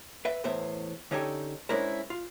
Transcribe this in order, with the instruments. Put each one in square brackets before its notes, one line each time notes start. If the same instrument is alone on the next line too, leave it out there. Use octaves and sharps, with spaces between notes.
[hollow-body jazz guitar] B4 E5
E2 A2 B3 C5 E5
D3 C#4 D#4 G4 A4 C#5
G#3 C#4 D4 E4 A#4 C5
F4